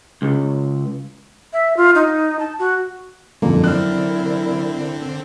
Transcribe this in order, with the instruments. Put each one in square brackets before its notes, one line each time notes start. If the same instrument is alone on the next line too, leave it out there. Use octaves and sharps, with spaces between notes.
[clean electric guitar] C#2
[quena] E5
F4
D#4
A5
F#4
[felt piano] G1 F2 [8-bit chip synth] A#2 [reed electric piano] G#3 A#3 A4 [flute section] D#4
[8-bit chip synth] D3 C4 [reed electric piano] F#3 F6 [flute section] E4 A#4 D5 [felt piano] F#6